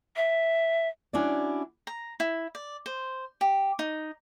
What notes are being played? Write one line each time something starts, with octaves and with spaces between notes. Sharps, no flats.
E5
C#4 D4 E4 F#4 D5
A#5
E4
D5
C5
G4
D#4